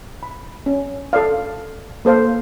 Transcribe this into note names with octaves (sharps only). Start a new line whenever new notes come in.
B5
C#4
A4 D5 F5
A#3 A4 C5 F5